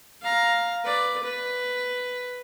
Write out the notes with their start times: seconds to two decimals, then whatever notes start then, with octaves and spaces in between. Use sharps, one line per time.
0.22 F5 A#5
0.84 B4 D5
1.23 B4